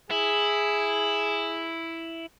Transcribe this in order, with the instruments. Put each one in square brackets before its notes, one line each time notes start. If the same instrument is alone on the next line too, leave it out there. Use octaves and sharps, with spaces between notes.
[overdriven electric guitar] E4 [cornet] G#4